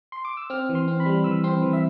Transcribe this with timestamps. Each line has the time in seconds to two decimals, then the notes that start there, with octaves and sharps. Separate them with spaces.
0.12 C6
0.25 D6
0.37 E6
0.50 C4 F6
0.69 E3
0.75 C6
0.88 C4
1.00 B5
1.06 G3
1.24 E3 E6
1.44 C4 C6
1.62 E3
1.73 E5